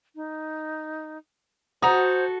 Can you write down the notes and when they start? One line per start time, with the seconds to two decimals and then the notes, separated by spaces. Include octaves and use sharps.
0.15 D#4
1.82 F#4 A4 C5 A#5 D#6